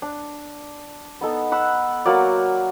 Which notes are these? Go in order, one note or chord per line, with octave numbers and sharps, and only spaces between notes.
D4
B3 D#4 A4
F#5 B5 E6
F#3 A#3 F#4 D5